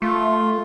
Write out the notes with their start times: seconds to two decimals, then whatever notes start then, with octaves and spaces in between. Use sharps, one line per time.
0.02 A3 F4